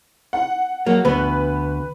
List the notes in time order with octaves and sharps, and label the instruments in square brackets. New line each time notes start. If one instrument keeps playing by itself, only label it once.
[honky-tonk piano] F#5
[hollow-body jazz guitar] F#3 A#3
[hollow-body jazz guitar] D2 B3 [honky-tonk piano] B4